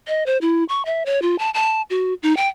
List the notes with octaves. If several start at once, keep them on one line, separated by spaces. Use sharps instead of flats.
D#5
C5
E4
C#6
E5
C#5
F4
A5
A5
F#4
D#4
G5